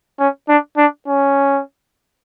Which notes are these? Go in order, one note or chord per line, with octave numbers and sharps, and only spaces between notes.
C#4
D4
D4
C#4